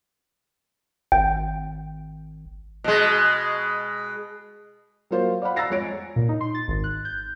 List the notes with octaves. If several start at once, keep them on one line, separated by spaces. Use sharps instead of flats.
G#1 G5
B2 G#3
F#3 A#3 F4 C5
D5 F5 F#5 B5
A#5 E6 F#6 A6 A#6 C7
F2 G#3 C#5 D7
A#2
D#4
C6
A6
G#1
F#6
G6